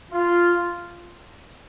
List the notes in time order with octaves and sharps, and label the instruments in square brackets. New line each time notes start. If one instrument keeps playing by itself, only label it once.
[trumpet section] F4